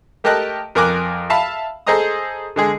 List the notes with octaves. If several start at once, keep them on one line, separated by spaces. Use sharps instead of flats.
A3 G4 A#4 D#5 A5 F#6
F2 A#4 G#5 D6 F#6
E5 F5 A5 B5
G#4 A4 C5 D#5 A#5 D#6
D3 G#3 G#4